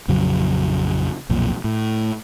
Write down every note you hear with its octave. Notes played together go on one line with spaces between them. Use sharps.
A#1 F2 C#3 F#3
B1 F2 A#2
A2